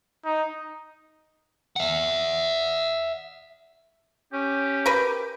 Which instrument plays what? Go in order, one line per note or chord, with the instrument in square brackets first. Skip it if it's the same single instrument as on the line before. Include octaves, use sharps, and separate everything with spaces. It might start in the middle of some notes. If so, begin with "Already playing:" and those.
[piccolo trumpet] D#4
[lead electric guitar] E5 F#5
[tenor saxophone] C#4 [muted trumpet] G4
[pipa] A#4 B4